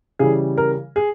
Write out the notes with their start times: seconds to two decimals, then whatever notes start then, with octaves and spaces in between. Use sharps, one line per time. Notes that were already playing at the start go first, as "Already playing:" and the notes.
0.19 C#3 E3 G3 G#4
0.58 A#4
0.96 G#4